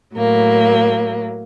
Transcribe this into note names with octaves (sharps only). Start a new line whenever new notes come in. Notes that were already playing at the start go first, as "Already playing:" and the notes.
A2 F#3 A#3